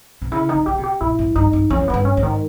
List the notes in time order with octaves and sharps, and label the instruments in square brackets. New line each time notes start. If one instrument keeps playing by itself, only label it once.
[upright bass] B2
[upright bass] C#3 [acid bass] E4
[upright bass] D#3 [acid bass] D#4
[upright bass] C#3
[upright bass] C#3 [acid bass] G4
[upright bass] B2
[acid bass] G4
[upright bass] A#2 [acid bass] E4
[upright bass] G#2
[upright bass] G2 [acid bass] D#4
[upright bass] G2
[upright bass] E2 [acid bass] C#4
[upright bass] E2 [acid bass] B3
[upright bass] G2
[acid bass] C#4
[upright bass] G#2
[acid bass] D#3